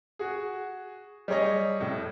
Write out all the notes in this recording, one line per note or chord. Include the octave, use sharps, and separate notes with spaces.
F#4 G#4
G3 G#4 C#5 D#5
F2 A2